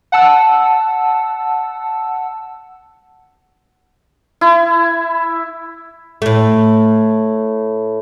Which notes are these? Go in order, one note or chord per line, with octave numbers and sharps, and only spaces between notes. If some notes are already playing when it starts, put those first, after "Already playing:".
F#5 A5 E6
E4
A2 A3